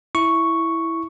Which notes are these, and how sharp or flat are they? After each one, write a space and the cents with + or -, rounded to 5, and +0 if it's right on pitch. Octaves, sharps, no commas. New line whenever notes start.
E4 +0 C#6 +0